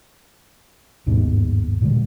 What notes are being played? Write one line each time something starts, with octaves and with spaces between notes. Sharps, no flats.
G1 D#2 G#2 B2
A#2 D3 G#3